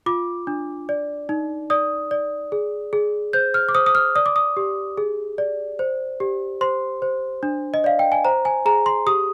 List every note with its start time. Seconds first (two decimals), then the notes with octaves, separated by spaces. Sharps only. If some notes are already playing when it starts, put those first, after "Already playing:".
0.06 F4 D6
0.47 D4
0.89 D5
1.29 D#4
1.70 D5 D#6
2.11 D5
2.52 G#4
2.93 G#4
3.33 C5 G6
3.54 F6
3.69 D6
3.75 C5 D#6
3.86 D#6
3.95 F6
4.15 D5 D#6
4.26 D6
4.36 D#6
4.57 G4
4.98 G#4
5.38 D5
5.79 C5
6.20 G4
6.61 C5 C6
7.02 C5
7.43 D4
7.74 D#5
7.84 D5 F5
7.99 G5
8.12 G#5
8.25 C5 A#5
8.45 G#5
8.65 G#4 A#5
8.86 C6
9.06 G4 D#6